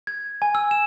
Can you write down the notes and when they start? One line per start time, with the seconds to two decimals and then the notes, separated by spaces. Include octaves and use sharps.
0.07 G#6
0.42 G#5
0.55 E6
0.71 E7